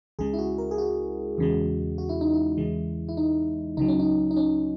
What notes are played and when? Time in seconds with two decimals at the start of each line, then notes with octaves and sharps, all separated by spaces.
0.19 C#2 C#3 G#3 G#4
0.34 E4
0.39 F#4
0.58 A#4
0.71 G#4
0.78 F#4
1.38 E2 C#3 G#3
1.98 F#4
2.09 E4
2.21 D#4
2.33 E4
2.57 E2 C#3 E3 G#3
3.09 E4
3.17 D#4
3.77 C#2 C#3 F#3 D#4
3.88 C#4
4.00 D#4
4.31 D#4
4.37 C#4